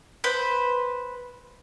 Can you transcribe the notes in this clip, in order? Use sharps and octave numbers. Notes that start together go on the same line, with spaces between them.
B4 C5